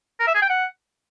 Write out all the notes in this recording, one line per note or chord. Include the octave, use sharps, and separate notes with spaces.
A#4
E5
G#4
G5
F#5